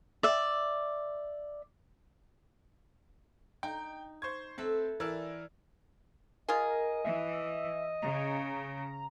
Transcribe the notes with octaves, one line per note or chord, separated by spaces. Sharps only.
D5 E5
D#4 G5
C5 C#6 G#6
C4 A4 B4 E5
E3 A#4 D5 A5 E6
F4 G#4 A#4 D#5
E3 E5
C#3 A#5